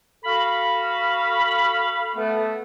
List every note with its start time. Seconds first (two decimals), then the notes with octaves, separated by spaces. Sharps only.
0.25 F#4 A4 F5 B5
2.15 A3 B3